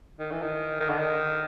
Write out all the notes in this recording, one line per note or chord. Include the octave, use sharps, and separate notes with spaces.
D#3
E3
D#3
D#3
D3
D#3